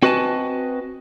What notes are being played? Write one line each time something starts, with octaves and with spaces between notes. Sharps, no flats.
C4 F#4 B4 D#5 G#5 A5